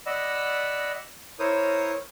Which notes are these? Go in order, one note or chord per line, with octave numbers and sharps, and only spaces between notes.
D5 D#5 F#5 B5 E6
E4 A#4 C5 C#5 D#6